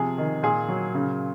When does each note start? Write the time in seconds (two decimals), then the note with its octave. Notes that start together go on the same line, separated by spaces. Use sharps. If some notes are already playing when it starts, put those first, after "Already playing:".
Already playing: C3 F3 G#4
0.18 D#3
0.43 A#2 G#4
0.68 F#3
0.95 C#3